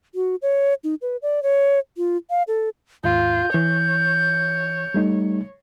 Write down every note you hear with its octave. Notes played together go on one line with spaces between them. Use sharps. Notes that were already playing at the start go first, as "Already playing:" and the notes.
F#4
C#5
D#4
B4
D5
C#5
F4
F5
A4
D#2 G#2 F4 G6
E3 C#5
G3 A3 D#4